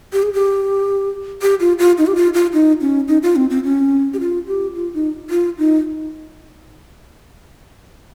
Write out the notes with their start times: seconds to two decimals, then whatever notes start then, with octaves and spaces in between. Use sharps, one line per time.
0.13 G4
0.23 G#4
0.33 G4
1.42 G4
1.60 F4
1.79 F4
1.98 D#4
2.07 G4
2.16 F4
2.34 F4
2.53 D#4
2.81 C#4
3.08 D#4
3.23 F4
3.36 C4
3.50 C4
3.64 C#4
4.13 G4
4.20 F4
4.47 G4
4.75 F4
4.94 D#4
5.30 F4
5.58 D#4